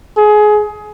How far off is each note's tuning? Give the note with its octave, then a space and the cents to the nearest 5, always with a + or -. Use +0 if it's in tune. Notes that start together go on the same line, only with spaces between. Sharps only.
G#4 +20